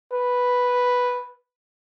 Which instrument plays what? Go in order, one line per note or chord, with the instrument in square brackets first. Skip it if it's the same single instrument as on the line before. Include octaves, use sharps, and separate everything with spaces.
[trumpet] B4